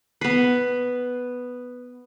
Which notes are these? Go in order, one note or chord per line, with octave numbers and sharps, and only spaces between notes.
B3 B4